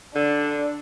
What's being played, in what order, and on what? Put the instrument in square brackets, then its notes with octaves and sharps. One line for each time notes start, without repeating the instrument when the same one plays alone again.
[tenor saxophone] D3 [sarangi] D4